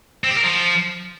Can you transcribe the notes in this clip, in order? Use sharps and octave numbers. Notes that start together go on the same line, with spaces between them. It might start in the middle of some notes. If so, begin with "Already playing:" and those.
C4
G4
A#4
F3